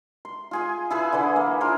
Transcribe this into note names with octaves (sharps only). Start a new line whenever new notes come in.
C6
F4 G#4 G#5
E4 G#4 B4
D3 E3
A#3
F4 G#4 A#4 C5